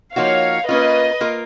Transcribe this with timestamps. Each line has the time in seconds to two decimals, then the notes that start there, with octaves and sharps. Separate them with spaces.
0.16 F3 A#3 D#4 F#4 C#5 F5
0.68 A#3 C#4 F4 B4 D#5
1.21 A#3 F4 A#4